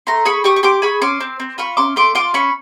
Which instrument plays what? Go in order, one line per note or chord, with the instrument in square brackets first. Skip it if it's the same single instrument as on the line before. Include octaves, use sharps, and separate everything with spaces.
[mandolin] A3 A#5 C6
G#4 B5 C#6
G4 C#6 D#6
C#6
G4 C6 D6
G#4 B5 C#6
C#4 C6 D6
C4
C4
F4 B5 C#6
C#4 C6 D6
A3 C6 D6
F4 C6 D6
C#4 B5 C#6